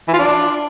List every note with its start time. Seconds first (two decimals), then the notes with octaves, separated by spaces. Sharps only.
0.08 E3
0.14 F4
0.19 D4